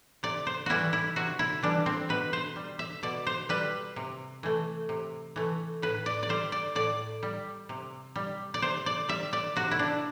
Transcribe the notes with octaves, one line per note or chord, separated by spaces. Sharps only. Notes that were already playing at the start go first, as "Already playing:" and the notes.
C3 D5
C5
E3 G3 E4 F#4
E4
C3 F#4
E4
E3 G3 D4
C4
B2 B4
C5
G3
E5
B2 D5
C5
G3 B4
C3
E3 A3
C3
E3 A3
A2 B4
D5
D5
G3 C5
D5
A2 D5
G3
C3
G3
D5
C3 C5
D5
G3 E5
D5
C3 F#4
E4
D4